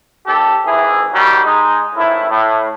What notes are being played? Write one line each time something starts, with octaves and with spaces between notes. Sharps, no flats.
D#2 G4 A4
G#1 E3 E4 G#4
D#3 F#3 G3
G#3 D#4
G#1 A2 E4
A2